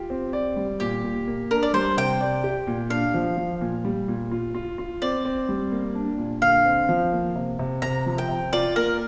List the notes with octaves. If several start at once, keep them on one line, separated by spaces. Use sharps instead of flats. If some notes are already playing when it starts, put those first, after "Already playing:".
Already playing: F4 G4
C4
D5
G3
A#2 G4
A#2
A#3
D4 A#4
D5
G3 C5
C3 G5
D5
G4
A#2
D4 F5
F3
F3
A#2
G3
A#2
F4
F4
F4
C4 D5
C4
G3
A#3
D4
A#2
D3 F5
C4
F3
A#3
C3
C3
C3 A#5
F3
G5
C3
F4 D5
A#3 A#4